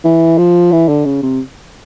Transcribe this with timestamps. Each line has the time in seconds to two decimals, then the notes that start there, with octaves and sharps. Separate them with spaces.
0.04 E3
0.38 F3
0.72 E3
0.88 D3
1.05 C#3
1.23 C3